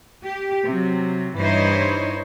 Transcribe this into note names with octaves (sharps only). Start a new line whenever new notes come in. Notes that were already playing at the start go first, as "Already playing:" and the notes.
G4
C3 F#3
G2 E3 D#4 E4 C5 C#5